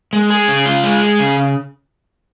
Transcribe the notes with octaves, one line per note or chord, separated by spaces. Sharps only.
G#3
G#4
C#3
F4
G#3
G#4
C#3